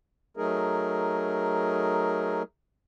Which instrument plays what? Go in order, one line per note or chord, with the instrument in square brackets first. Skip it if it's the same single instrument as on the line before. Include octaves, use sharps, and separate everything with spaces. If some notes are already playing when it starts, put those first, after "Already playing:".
[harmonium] F#3 A3 D#4 G#4 A#4